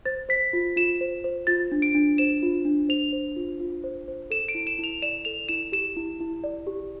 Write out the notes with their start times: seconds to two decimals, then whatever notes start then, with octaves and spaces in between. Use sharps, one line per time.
0.05 C5 A6
0.29 C5 B6
0.53 F4
0.76 F4 E7
1.01 C5
1.24 C5
1.47 F4 A6
1.72 D4
1.82 D7
1.94 D4
2.18 C5 E7
2.43 F4
2.65 D4
2.89 C5 F7
3.13 C5
3.36 F4
3.60 F4
3.84 C5
4.08 C5
4.30 A4 E7
4.48 D7
4.55 E4
4.67 E7
4.79 E4 F7
5.02 D5 E7
5.25 A4 F7
5.49 E4 E7
5.72 G4 E7
5.96 E4
6.21 E4
6.44 D5
6.67 G4